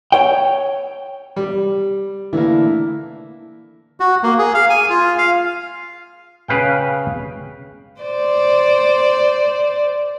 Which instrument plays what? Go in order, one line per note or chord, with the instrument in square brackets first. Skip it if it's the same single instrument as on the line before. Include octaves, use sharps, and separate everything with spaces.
[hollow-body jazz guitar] C#5 G5
[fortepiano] G3
[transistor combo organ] D3 A3 E4 [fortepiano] E3 A#3
[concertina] F#4
A#3
G#4
F5
G#5
F4
F5
[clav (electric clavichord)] C#3 B4 F5 G5
[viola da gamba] C5 D5